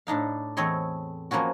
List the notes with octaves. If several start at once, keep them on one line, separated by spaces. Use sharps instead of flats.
A2 D4 D#4 F5
E2 A3 C4 C#5 D#5 C6
F3 A#3 B3 C#4 F#4